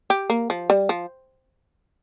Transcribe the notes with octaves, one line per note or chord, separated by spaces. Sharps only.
G4
A#3
F3
G3
F3